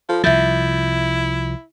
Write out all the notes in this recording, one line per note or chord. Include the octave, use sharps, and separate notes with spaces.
F3 F4 A4
C2 F3 E4 E5 G6 A6